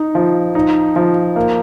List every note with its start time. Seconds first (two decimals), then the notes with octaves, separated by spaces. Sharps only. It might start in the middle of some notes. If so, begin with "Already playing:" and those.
Already playing: D#4
0.15 F3
0.55 D#4
0.96 F3
1.36 A#3